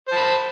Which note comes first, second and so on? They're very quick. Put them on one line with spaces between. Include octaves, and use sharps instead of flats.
C5 A5 B5